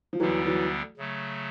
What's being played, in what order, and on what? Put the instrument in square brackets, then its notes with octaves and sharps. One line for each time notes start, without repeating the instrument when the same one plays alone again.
[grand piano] F3
[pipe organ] D2 D3 G3 B3 [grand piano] E3 F#3
[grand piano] E3 F#3
[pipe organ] C#3 F#3 A3